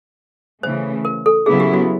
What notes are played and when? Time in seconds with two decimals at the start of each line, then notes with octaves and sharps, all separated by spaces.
0.63 C#3 E3 A3 C5
1.05 A#4
1.26 A4
1.46 C#3 F#3 B3 E4 G#4
1.60 G4
1.74 F#4